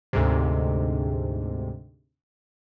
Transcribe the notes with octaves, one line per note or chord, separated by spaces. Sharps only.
D2 G#2 C3